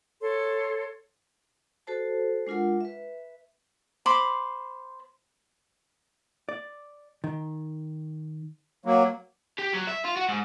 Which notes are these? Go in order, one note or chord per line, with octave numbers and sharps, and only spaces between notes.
A4 C#5 C6
F#4 A4 C5 A5
G#3 D4 F4 A#4 F#5
B4 E5
C5 B5 C6 D6
D5
D#3
F#3 A#3
G4
F#3
E5
F4
F#4
G#2